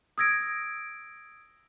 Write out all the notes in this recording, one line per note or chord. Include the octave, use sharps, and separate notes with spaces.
D#6 E6 G#6 A#6 D7